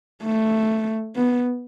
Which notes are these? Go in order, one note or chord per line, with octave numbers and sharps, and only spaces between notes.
A3
B3